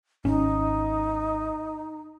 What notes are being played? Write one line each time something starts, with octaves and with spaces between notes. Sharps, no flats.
G#1 C#4 D#4